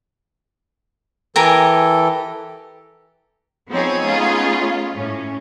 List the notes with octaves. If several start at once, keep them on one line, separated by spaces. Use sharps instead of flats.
E3 G4 A4 A#4 G#5
F3 B3 C4 D#4 G#4 C#5
A3 C#4 F4
A2 C#4